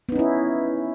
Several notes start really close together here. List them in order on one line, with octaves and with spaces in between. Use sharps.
B3 D#4 C#4 E4